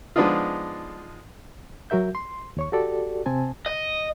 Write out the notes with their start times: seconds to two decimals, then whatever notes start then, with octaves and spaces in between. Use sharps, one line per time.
0.16 F3 G#3 B3 D4 D#4 F4
1.90 F#3 F#4 A#4 E5 G6
2.15 C6
2.57 D#2 C#5 C#6
2.72 F#4 G4 A4 D5
3.26 C3 C4 G#5 A5
3.66 D#5